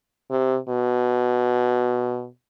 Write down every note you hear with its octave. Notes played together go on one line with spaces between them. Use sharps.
C3
B2